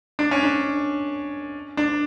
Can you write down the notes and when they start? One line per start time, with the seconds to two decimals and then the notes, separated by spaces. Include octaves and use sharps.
0.19 D4
0.31 C#4
0.43 D4
1.77 D4